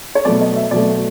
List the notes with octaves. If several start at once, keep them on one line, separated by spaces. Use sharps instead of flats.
C#5
B2 F#3 A3 D5
D#5
E5
B2 F#3 A3 D5